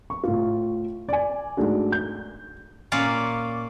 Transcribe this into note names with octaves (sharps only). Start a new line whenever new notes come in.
C#6
A2 F4
D5 G#5
G#2 G#3 A3 D4 F#4
G6
A#2 A#3 C#4 D5 F5